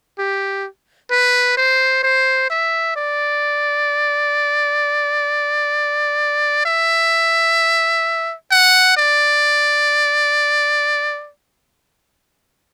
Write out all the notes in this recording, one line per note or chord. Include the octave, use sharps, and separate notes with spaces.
G4
B4
C5
C5
E5
D5
E5
F#5
D5